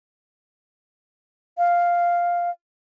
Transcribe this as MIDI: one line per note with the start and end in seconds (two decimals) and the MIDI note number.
1.58 2.50 77